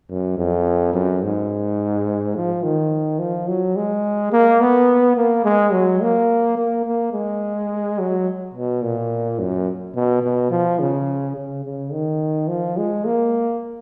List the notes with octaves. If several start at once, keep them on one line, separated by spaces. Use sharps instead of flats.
F#2
F2
F#2
G#2
F3
D#3
F3
F#3
G#3
A#3
B3
A#3
G#3
F#3
A#3
A#3
A#3
G#3
F#3
B2
A#2
F#2
B2
B2
F3
C#3
C#3
C#3
D#3
F3
G#3
A#3